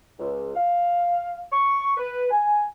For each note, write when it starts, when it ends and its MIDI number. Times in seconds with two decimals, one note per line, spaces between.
0.19 0.56 37
0.56 1.41 77
1.51 1.92 85
1.97 2.27 71
2.31 2.64 80